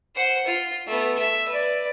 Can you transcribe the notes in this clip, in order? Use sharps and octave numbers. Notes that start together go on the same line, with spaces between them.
C5 F#5
F4
A3 B3
E5
B4 D5